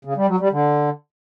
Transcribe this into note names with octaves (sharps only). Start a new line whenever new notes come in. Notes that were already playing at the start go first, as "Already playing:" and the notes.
C#3
G3
F#3
G3
D3